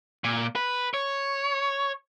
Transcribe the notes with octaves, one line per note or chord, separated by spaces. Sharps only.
A#2
B4
C#5